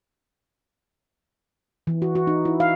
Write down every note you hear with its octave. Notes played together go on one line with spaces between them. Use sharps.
E3
F#4
F#4
D#4
E4
F5